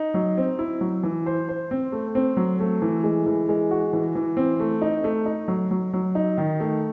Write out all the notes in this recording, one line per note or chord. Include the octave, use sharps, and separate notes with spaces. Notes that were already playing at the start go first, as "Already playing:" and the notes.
Already playing: D#4
F#3
C4
E4
F#3
E3
C5
C5
C4
A3
C4
F#3
A3
E3
G#3
E3
G#3
F#4
E3
E3
C4
A3
D#4
A3
D#4
F#3
F#3
F#3
D#4
D#3
A3